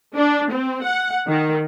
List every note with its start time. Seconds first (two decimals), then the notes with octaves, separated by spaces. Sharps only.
0.16 D4
0.52 C4
0.85 F#5
1.29 D#3